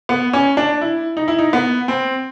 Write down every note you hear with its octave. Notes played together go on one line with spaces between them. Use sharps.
B3
C#4
D4
E4
D#4
E4
D#4
B3
C4